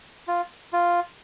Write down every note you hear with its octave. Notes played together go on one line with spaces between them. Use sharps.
F4
F4